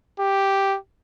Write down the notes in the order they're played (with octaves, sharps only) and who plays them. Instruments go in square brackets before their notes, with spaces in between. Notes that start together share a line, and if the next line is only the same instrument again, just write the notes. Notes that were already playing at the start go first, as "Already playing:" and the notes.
[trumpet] G4